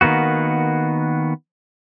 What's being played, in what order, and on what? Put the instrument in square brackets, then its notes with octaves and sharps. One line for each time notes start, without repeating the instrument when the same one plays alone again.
[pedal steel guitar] D#3 A#3 B3 F#4